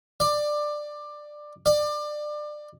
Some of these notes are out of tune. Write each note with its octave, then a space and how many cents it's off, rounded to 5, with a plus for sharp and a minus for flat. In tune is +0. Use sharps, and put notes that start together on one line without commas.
D5 +15
D5 +25